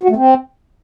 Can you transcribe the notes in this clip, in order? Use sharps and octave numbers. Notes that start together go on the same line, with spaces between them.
F#4
A3
C4